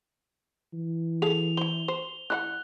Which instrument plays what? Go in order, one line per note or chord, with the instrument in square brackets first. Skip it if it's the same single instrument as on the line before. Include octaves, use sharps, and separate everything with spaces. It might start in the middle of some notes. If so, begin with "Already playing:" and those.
[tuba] E3
[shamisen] G#4 A4 F5 [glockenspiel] F7
[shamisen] E4 C5 [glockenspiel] G7
[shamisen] C5
[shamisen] E3 E4 F#5 [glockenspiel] F#6